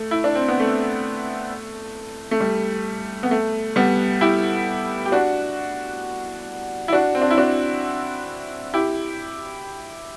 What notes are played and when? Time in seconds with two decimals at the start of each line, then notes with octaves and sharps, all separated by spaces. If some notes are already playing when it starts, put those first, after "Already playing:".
Already playing: A3
0.11 E4
0.24 D4
0.35 C4
0.48 B3
0.60 A3
2.31 A3
2.40 G3
3.23 B3
3.31 A3
3.76 G3 B3
4.21 E4 G4
5.06 G4
5.12 D4 F#4
6.88 E4
6.93 D4 F#4
7.15 C4
7.22 D4
7.30 E4
7.37 D4 F#4
8.74 E4 G4